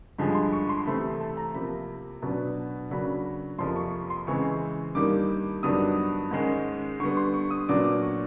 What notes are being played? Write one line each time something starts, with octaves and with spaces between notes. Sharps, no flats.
G2 D3 F3 G#3 B5
C6
C#6
C6
C3 E3 A3 C4 B5
A5
A#5
C3 F3 A#3 B5
B2 F#3 B3 D4
C#3 F#3 A#3 D4 B5
F2 C3 F3 A#3 C6
C#6
C6
C#3 E3 G#3 C4 C#6
G2 D#3 G3 A#3 D6
G2 D#3 F#3 B3 D4 D#6
G#2 D#3 G#3 C#4
D3 G3 B3 C#6
C6
C#6
D#6
A#2 F#3 B3 D4 D6
D6
C#6